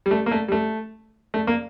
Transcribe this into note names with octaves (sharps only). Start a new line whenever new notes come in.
G3
A3
A#3
A3
G3
A3
A3
A#3